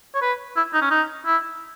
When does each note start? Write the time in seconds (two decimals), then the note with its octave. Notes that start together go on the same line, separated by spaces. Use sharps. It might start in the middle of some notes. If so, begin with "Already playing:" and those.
0.15 C#5
0.22 B4
0.57 E4
0.74 D#4
0.82 C#4
0.91 D#4
1.26 E4